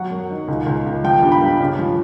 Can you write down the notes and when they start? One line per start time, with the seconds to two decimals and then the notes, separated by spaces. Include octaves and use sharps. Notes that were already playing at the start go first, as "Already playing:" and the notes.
Already playing: F#3 F#5
0.11 F#2
0.30 D#3
0.48 C#2
0.66 C#2
0.86 C#2
1.04 F3 G5
1.22 G2
1.32 B5
1.42 G2
1.60 C#3
1.79 F3